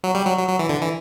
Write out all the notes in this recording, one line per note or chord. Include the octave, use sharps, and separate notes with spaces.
F#3
G3
F#3
F#3
F#3
E3
D3
E3